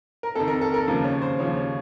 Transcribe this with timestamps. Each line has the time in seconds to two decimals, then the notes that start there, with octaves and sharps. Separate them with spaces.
0.23 A#4
0.35 F2 D#3 A4
0.48 A#4
0.61 A4
0.74 A#4
0.88 D#2 C#3 F3
1.04 C#5
1.22 C5
1.39 D#2 C#3 F3 C#5
1.57 C#5